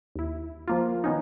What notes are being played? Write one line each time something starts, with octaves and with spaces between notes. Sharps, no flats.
D#2 E4
F3 A#3 F4
D#3 B3 C#4 D#4